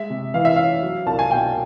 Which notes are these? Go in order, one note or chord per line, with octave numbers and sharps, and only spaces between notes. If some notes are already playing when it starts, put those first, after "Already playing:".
Already playing: G#3 E5
C3
E3 F5
E5
C#4 F5
F#3
C2 A5
G#5
B2 G5